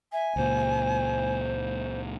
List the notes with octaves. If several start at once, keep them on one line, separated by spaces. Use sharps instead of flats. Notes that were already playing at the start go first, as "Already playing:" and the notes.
E5 G#5
C#2 A#2 C5